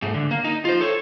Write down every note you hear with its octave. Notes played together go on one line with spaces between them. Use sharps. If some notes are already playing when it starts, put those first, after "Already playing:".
G#2 A3
D3
A#3
D#4
F4 C5
A4 C#5